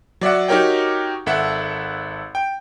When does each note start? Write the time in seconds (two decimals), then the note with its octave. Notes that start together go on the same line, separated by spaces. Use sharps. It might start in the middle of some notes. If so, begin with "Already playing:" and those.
0.21 F#3 D5 E5 F#5
0.48 D#4 F#4 G4 A#4 C#5 G5
1.26 G#1 A4 E5 F#5
2.35 G5